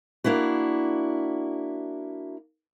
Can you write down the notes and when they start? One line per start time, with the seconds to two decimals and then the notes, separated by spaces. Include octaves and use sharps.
0.24 A#3 D4 E4 F#4